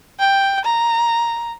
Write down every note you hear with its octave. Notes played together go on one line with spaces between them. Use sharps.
G5
A#5